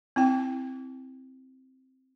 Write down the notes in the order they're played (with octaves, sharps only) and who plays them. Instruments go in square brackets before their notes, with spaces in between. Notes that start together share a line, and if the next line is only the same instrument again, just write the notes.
[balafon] C4 E4 G5